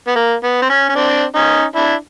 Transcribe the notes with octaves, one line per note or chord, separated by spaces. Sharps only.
B3
A#3
B3
C4
C#4
C#4
C4 D4
C#4 D#4
D4 E4